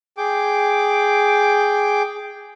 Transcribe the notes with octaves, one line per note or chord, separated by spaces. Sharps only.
G#4 G5 D6